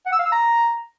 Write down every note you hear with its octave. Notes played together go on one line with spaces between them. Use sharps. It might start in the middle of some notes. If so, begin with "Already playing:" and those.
F#5
E6
F5
E6
A#5